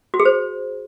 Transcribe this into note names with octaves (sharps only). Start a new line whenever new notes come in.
F#4
G#4
C5